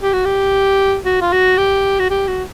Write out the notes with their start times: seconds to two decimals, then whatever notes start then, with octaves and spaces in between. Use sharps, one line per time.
0.02 G4
0.13 F#4
0.25 G4
1.05 F#4
1.21 F4
1.32 F#4
1.57 G4
1.99 F#4
2.10 G4
2.27 F#4